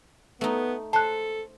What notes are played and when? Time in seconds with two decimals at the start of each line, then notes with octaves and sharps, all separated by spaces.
0.41 A3 B3 D#4
0.93 A4 C5 A5 F#6